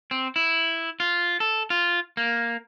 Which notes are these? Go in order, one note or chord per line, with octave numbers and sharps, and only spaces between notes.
C4
E4
F4
A4
F4
A#3